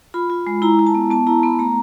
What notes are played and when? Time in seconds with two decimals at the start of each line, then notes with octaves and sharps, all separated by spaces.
0.14 F4 B5
0.30 F4
0.47 G#3
0.62 E4 A#5
0.79 E4
0.87 A5
0.95 B3
1.10 B3 A5
1.27 E4 A#5
1.43 B3 B5
1.59 A3 A#5